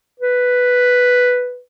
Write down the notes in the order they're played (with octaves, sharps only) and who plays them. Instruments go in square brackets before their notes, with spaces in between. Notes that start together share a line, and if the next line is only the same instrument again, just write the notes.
[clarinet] B4